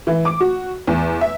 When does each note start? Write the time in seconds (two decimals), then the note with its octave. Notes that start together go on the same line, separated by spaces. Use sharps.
0.07 E3
0.25 D6
0.40 F#4
0.87 E2
1.21 E5